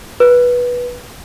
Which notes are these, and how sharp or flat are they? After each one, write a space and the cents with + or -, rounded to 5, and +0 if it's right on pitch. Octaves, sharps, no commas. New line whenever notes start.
B4 -15